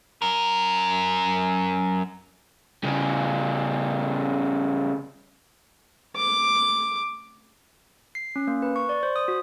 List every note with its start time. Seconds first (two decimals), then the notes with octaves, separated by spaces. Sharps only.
0.22 F#2 A#4
2.84 C#3 G3
6.16 D6
8.15 C7
8.36 C#4
8.47 A#3
8.62 B4
8.76 C#6
8.89 D5
9.03 C5
9.16 D#6
9.28 F#4